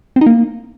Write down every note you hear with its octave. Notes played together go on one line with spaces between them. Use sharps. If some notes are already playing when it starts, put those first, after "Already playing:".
C4
D#4
A#3